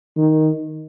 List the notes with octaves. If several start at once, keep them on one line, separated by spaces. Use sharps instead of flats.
D#3